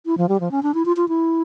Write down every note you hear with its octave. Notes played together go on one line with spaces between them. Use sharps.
E4
F3
G3
F3
C#4
D4
E4
F4
F4
E4